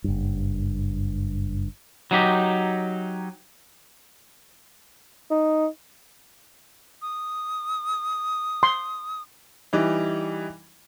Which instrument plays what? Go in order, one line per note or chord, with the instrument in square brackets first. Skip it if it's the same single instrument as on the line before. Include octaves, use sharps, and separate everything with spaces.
[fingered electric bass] F#1 G2
[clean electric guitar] F#3 D#4 G4
[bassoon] D#4
[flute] D#6
[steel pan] C6
[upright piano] E3 G3 D#4